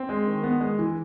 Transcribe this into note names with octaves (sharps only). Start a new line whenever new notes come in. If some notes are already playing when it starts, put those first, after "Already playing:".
Already playing: C4
G#3
D#3
B3
G#3
E3